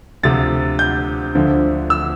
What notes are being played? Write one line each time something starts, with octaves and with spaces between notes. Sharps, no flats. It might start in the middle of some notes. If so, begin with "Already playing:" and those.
D2 C3 F3 A6
G6
D2 D3 F3
E6